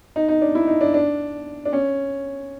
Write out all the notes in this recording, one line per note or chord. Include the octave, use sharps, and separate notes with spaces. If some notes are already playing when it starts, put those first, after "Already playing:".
D#4
D#4
D4
E4
D#4
D4
D4
D4
C#4